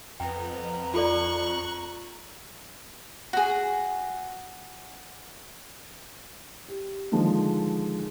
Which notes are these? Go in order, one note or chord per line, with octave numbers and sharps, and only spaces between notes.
F2 B3 G5 A#5
F4 A4 D5 C#6 F#6
F#4 G#4
G4
D3 D#3 F3 G#3